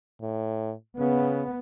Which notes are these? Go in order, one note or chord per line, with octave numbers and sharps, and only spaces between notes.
A2
C#3 B3